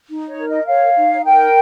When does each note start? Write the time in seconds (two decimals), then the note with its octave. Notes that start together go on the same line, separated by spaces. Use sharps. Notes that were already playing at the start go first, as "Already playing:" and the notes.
0.10 D#4
0.28 C#5
0.39 A#4
0.48 D#5
0.67 C#5 F5
0.97 D#4
1.25 A#4 G5